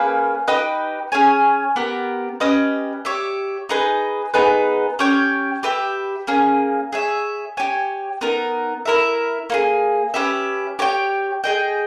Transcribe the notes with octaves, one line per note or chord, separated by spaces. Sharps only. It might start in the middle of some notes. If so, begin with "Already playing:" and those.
Already playing: A#3 C#4 G#4 B4
D#4 G4 B4 D#5
C#4 G#4 C#5 G#5
B3 G4 A#4
C#4 G4 B4 D#5
G4 C#5 E5
D#4 G#4 B4 D#5
B3 D#4 G#4 B4
C#4 G4 C#5 G5
G4 B4 E5 G5
A#3 C#4 G#4
G#4 C#5 E5
G4 C#5 G#5
B3 D#4 A#4
E4 A#4 E5
A#3 D#4 G#4
C#4 G4 B4 E5
G4 C#5 G5
G#4 D#5 G5